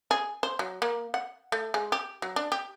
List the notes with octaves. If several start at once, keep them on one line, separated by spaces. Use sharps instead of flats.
G#4
C5
F#3
A#3
F#5
A3
G#3
G4
F#3
D4
G4